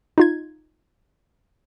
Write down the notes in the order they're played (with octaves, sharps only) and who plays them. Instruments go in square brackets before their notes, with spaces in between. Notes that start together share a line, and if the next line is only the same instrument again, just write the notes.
[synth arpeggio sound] D#4 F4 G#6